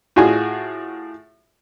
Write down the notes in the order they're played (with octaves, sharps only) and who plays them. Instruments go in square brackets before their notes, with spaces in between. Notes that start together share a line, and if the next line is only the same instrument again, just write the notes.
[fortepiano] A2 F4 F#4 G#4 G#5